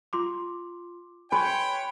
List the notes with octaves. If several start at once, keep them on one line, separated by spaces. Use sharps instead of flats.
F4 C6 D6
B4 C#5 G5 G#5 C6